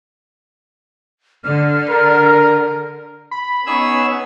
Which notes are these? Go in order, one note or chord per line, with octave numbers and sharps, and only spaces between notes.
D3 F6
A#4
B5
B3 C#4 D#4 G#4 C#5 E6